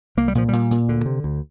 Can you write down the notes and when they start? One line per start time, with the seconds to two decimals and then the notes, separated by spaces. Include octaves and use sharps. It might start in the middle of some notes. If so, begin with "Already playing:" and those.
0.17 C2 A#3
0.28 G3
0.35 A#2 F3
0.49 A#2 G3
0.71 A#2
0.88 D2 D3
1.06 C3
1.24 D2